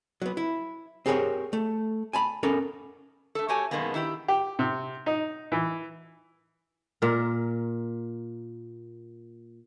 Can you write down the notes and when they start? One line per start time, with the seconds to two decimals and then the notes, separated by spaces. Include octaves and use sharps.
0.22 F#3 B3
0.37 E4
1.06 C4 G4 G#4 A#4 B4 C#5
1.53 A3
2.13 G#5 A5 B5
2.43 B3 C#4 A4 A#4
3.35 A3 A4
3.48 A3 F#4 G4 C#5 G#5 A5
3.71 F#2 B2 D#3 G#3 A#3 B3
3.94 D#3 E4 G4 G5
4.28 G4
4.59 C3
5.06 D#4
5.52 E3
7.02 A#2 A#4